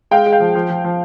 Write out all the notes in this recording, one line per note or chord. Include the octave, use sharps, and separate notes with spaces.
G#3 F5 G5
G#3
F5 G5
F3
F3
F3
F3